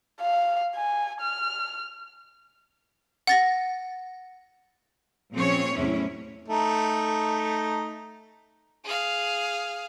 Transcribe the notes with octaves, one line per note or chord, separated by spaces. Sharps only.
F5
G#5
F6
F#5 A6 A#6
A#2 F3 C4 C#4 G#4 C#5
E2 A2 C3 F#3 C#4 E4
A3 D#4
G#4 F5